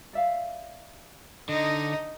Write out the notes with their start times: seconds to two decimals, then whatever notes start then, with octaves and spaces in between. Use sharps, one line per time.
0.13 D5 E5 F5
1.49 D3 D#4 D#5